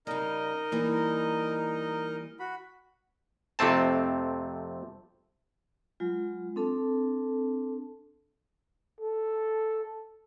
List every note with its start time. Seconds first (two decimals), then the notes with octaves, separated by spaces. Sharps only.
0.07 C#3 G3 D#4 A#4 D#5
0.72 E3 G3 A#3
2.40 F#4 B5
3.59 F2 C3 A3 C4 A5
6.00 F#3 G#3 F4
6.56 C4 D4 A4 A5
9.00 A4